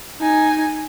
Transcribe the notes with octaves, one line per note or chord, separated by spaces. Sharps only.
D#4 G#5